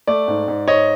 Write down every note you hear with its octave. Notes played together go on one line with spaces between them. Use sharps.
A3 D5
G#2
G#2
G#2 C#5 D#5